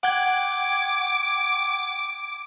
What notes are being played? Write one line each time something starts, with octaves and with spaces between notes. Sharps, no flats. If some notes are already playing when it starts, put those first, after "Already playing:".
F#5 G5 D6 G#6